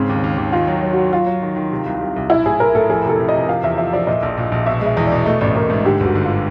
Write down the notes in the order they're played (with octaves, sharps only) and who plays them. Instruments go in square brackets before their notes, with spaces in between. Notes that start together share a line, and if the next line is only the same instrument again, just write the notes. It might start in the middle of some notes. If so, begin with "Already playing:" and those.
Already playing: [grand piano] G#2 C#3 [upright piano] C4
[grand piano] D#2
D#2
D#2
[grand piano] D#3 [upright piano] F4
[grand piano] F#3
F#3
[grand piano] F#3 [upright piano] F#4
[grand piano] F#3 [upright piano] F4
[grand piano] F#3
D#3
D#3
C3
C2
C2
C2
[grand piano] B1 [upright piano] E4
[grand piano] A2 [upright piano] G#4
[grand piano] A2 [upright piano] A#4
[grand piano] A2 [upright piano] A4
[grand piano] F2 [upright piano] G#4
[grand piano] C3 [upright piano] A4
[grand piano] C3
[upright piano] D#5
[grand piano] C3
[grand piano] F3 [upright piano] F5
[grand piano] E2 [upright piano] E5
[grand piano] F3 [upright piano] E5
[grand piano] F3 [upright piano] D5
[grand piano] A#2 [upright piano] D#5
[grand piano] A#1
A#2
A#1
[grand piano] B2 [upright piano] E5
[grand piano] G#3
[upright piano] E5
[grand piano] E2
[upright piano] D5
[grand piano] B2
[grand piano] A3 [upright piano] D#5
[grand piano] A1 [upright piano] D5
[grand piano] A1 [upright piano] A#4
[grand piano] G#2
[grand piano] D3 [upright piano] G4
[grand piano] G1 [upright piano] F#4
[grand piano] D3
[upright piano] F4